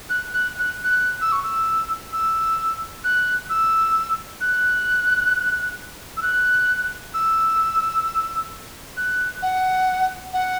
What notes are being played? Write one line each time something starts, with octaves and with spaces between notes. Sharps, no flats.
F#6
F#6
F#6
F#6
E6
C#6
E6
E6
F#6
E6
F#6
E6
F#6
E6
F#6
F#5
F#5